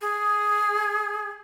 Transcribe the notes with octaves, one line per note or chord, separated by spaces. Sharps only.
G#4